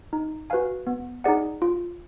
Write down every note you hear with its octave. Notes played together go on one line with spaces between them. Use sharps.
D#4
F#4 B4 F5 G#5
B3
D#4 G#4 D5 F#5
F4